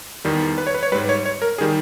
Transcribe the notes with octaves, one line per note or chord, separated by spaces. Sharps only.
E2 D#3 G3
B4
C#5
B4
C#5
G#2 G3 B4
C#5
C#5
A#4
D#3 G3 G#4